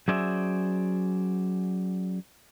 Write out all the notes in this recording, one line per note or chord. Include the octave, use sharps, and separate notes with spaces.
F#3 C#4 G#4 C5 D5 E5